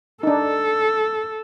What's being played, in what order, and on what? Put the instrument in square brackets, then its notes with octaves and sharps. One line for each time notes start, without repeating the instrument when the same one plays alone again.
[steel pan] D4 D#4 [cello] A4